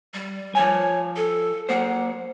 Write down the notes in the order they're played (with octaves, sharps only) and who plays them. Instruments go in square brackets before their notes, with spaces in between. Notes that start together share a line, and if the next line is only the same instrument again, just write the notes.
[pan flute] G3
[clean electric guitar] F3 G#5 [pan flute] C#5
[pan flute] A4
[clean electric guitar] F#3 A#3 C5 [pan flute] F#5